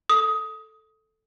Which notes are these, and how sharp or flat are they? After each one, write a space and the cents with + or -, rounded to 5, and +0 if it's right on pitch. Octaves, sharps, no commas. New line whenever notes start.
A4 +0 D#6 +15